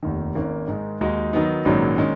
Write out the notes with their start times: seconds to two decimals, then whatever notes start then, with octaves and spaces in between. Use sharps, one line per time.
0.03 F1 D#2 D#3
0.35 G#1 G#2 D#3 A#3 C#4
0.68 G#2 D#3 G#3
1.01 D#2 D#3 G#3 D#4 F#4
1.33 D#3 F#3 B3 D#4
1.65 A#1 G#2 D#3 F#3 C#4
1.98 D#3 G#3 C#4